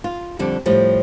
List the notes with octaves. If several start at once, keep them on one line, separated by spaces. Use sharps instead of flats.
F4
F2 D3 G3 A4
A2 F3 G3